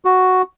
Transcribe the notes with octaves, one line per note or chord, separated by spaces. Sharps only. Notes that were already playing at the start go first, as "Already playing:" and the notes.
F#4